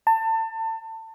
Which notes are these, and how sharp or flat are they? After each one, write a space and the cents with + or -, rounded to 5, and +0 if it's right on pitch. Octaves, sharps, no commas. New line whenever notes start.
A5 +30